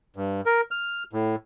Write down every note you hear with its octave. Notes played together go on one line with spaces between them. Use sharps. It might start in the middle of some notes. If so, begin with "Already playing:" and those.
G2
A#4
F6
A2